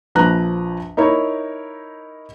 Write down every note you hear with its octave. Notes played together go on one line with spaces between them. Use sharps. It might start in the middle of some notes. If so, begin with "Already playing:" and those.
A#1 F3 B4 A#5 F#6
D#4 E4 A#4 C#5